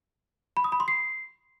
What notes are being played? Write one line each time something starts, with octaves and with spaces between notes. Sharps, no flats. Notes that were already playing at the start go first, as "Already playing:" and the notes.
B5
D#6
B5
C6
C7